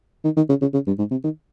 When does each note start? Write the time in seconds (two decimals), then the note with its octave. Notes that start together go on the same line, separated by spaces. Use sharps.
0.25 D#3
0.37 D#3
0.49 C#3
0.62 C#3
0.74 C#3
0.87 G2
0.99 G#2
1.11 C3
1.24 D#3